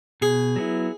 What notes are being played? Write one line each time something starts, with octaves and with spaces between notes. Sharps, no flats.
B2 G#4
F#3 B3 E4